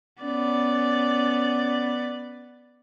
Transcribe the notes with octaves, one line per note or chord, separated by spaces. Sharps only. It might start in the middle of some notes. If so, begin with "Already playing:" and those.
B3 C#4 D5